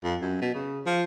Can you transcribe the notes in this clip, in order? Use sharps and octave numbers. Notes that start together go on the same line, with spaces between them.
F2
F#2
B2
C#3
F3